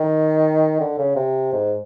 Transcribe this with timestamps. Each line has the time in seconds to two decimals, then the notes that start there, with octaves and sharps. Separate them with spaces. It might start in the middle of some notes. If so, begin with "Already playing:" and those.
Already playing: D#3
0.80 D3
0.98 C#3
1.16 C3
1.53 G#2